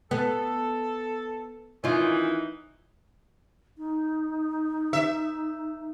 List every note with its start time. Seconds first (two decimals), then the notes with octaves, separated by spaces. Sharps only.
0.11 B3 A4
1.84 D#3 E3 C#4 D#4 F4
3.78 D#4
4.93 E5